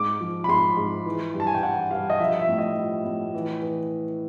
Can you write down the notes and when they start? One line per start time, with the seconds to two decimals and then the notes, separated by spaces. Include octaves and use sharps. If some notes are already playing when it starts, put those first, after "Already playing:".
Already playing: G#2 D6
0.20 F3
0.44 B5
0.48 G#2 C6
0.77 G#2
1.06 E3
1.34 G2
1.40 A5
1.47 G#5
1.55 G5
1.62 E3 F#5
1.91 G2 F5
2.10 D#5
2.19 F3 E5
2.39 E5
2.48 A2
2.58 D#5
2.76 F3
3.05 A2
3.34 E3
3.62 E3